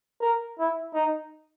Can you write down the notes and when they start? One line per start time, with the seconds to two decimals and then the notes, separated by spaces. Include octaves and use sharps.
0.21 A#4
0.59 E4
0.95 D#4